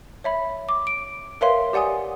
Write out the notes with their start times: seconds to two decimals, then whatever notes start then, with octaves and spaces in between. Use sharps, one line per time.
0.24 C#5 E5 B5
0.69 D6
0.87 D7
1.41 A#4 B4 C#5 E5 F5 C6
1.73 G4 D5 F#5 G#5 D#6